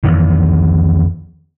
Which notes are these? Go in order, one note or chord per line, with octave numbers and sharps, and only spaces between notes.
F2 D#3 E3